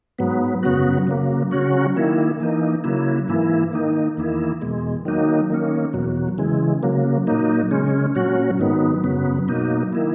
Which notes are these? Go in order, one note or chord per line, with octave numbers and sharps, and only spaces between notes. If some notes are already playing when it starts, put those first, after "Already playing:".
G#2 F#3 B3
F#2 C#3 F#3 B3 F#4
C#3 F#3 A#3
C#3 F#3 C#4 F#4
D#3 A#3 E4
E3 A#3 D#4
C#3 F#3 A#3 E4
G#2 E3 A#3 E4
D#3 A#3 D#4
E2 D#3 A#3 E4
E2 B2 G#3
D#3 F#3 A#3 D#4
D#3 A#3 C#4
E2 B2 F#3
C#3 E3 G#3
C#3 F#3 A#3
A#2 F#3 A#3 D#4
C#3 G#3 C#4
A#2 F#3 C#4 F#4
G#2 D#3 F#3 B3
F#2 C#3 F#3 B3
B2 F#3 A#3 D#4
D#3 A#3 E4